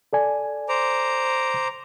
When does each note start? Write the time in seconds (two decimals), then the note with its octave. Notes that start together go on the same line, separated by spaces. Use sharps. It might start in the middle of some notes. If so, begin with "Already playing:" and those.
0.13 A4 D5 G#5
0.69 C5 A#5 D6